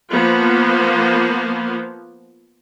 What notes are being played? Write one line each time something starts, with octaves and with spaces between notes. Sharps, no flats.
F3 A#3 B3